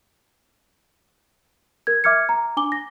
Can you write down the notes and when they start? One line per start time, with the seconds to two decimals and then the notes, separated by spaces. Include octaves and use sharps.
1.87 A#4 G#6
2.04 E5 D6 F6 G#6 C#7
2.29 A#5
2.57 D4 G#5 D6 G7
2.72 A#6